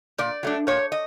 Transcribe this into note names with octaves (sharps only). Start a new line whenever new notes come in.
A#2 D5
F#3 A3 D4
A#2 C#5
D#5